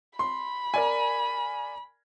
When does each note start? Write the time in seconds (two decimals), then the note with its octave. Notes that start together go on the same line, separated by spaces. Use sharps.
0.19 B5 C6
0.74 A#4 D5 G#5